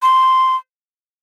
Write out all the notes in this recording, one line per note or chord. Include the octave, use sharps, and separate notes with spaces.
C6